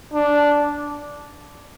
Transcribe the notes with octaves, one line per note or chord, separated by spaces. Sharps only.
D4